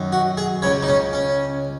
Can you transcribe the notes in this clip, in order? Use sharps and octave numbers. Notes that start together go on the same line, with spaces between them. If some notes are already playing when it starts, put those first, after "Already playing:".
Already playing: F#2 D#3
F#4
G#4
C#2 C#3 C#5
D#4
C#4
C#4